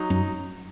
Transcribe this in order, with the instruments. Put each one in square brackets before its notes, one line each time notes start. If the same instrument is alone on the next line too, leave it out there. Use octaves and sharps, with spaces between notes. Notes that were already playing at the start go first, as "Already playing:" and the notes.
Already playing: [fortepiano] F#3 D#4
[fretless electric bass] F#2